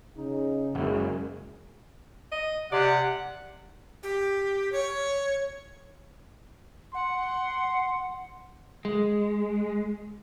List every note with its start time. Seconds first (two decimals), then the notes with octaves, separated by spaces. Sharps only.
0.16 C#3 D#4
0.75 F#1 F#2 G#3
2.32 D#5
2.72 C3 D5 F#5
4.03 G4
4.72 C#5
6.94 F#5 C6
8.85 G#3